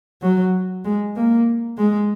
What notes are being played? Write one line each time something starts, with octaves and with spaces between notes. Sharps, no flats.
F#3
G#3
A#3
G#3